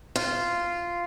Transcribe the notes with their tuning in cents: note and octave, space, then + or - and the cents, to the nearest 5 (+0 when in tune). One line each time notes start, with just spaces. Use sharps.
F4 -10